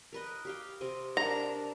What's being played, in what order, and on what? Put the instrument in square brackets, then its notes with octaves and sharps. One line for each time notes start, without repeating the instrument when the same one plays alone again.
[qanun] A#4 B4 D#5
G4 F5 G5
C3 C4 D#5
[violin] D4 A#4 [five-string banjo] A#5